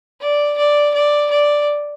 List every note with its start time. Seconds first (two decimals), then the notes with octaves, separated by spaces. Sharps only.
0.21 D5
0.58 D5
0.94 D5
1.31 D5